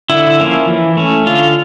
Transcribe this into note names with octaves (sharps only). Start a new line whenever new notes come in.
D3 E4
F3 A#3 C#4
E3
A3 C#4
D3 F4